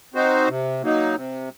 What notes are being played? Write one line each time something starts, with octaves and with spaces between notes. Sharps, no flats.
C4 D#4 F#4 C5
C3
F#3 A#3 D#4
C3